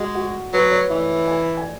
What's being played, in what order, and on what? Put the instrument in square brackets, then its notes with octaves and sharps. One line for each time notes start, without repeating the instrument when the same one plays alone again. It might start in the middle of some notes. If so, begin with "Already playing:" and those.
Already playing: [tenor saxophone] G#3 [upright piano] F#4
[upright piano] F#4
[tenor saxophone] F#3 [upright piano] B4
[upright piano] C#5
[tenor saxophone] E3 [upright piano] E5
[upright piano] G#5
G#5